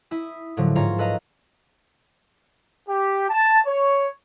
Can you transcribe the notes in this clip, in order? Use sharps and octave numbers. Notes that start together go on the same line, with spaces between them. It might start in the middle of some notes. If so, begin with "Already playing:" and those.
E4 E5 D#6
A2 D3 F3 F#3
G#2 F4 C#5 A#5
A4 B4 D#5 F5 A#5 F6
G4
A5
C#5